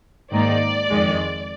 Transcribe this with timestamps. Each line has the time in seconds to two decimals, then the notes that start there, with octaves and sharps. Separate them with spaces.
0.32 G#2 D#3 A#3 D#4 D5
0.90 F2 D#3 G#3